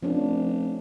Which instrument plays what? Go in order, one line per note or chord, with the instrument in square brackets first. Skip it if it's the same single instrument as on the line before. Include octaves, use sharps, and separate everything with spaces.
[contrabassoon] F1 [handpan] F3 C#4 D4